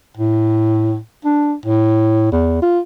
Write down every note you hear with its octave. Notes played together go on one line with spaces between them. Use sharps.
A2
D4
A2
E2
F4